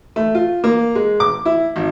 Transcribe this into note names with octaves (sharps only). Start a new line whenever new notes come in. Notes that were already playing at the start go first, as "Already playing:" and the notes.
A3
F4
A#3
G#3
D6
E4
G#1